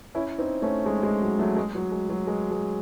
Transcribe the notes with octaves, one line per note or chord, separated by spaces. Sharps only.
C#4 E4
C4 D#4
A3 C#4
G#3
G#3
F#3
F#3 A3
G#3
F#3
G#3
F#3
G#3
G#3